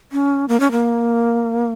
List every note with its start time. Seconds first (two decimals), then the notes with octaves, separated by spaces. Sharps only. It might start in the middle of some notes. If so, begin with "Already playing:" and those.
0.12 C#4
0.49 A#3
0.60 C#4
0.71 A#3